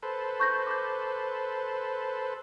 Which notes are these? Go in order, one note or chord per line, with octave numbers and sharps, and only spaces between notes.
A4 B4 C5
C#6 G6 A#6
D6 G6